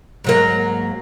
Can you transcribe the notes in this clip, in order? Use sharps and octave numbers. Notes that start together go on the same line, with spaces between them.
G#2 F#3 A#3